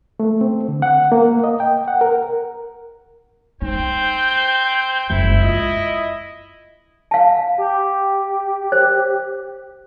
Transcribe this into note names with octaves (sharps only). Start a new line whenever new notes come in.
A3
C4
D3
F#5
A#3
D#5
G5
F#5
A#4
C4 D#4 G6
F#1 G#2 E4
F4 D#5
F5 A5
G4
C5